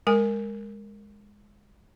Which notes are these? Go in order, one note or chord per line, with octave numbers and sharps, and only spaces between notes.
G#3 A#4 G#5